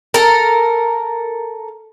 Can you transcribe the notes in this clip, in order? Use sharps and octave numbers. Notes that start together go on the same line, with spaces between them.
A4 A#4